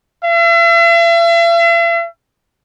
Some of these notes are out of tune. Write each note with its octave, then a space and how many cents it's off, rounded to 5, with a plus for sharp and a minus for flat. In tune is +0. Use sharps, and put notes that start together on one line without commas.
E5 +45